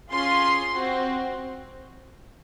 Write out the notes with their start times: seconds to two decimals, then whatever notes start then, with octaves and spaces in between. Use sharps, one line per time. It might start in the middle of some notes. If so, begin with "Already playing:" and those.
0.12 C#4 F4 G#4 C6
0.73 C4 F#4